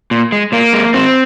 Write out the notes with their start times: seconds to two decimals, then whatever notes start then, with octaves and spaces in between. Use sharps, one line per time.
0.11 A#2
0.32 G#3
0.52 A#2 A#3
0.73 G#3
0.94 G#2 C4